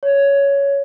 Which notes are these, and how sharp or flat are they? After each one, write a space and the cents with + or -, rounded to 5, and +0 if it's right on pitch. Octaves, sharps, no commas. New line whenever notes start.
C#5 +10